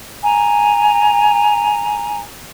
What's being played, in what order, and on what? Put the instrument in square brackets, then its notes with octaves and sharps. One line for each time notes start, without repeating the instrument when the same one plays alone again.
[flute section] G#5 A#5